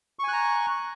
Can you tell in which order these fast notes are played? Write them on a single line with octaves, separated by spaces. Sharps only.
C#6 G#5 F#6 A#5